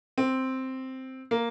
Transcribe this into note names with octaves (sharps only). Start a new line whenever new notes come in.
C4
A#3